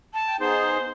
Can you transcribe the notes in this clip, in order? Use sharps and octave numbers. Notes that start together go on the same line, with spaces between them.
A5
G5
B3 D#4 G#4 C5